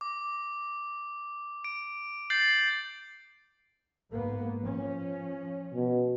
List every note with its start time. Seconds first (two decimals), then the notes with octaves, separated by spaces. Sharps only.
0.01 D6
1.64 D7
2.30 G6 A6 C7 F#7
4.09 G#2 A#3 B3
4.61 F3 C#4
5.74 B2